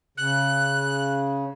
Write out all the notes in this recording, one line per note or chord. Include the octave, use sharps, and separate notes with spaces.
C#3 F#6